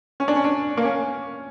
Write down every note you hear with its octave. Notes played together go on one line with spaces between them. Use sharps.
C#4
D4
C#4
D4
A#3
C#4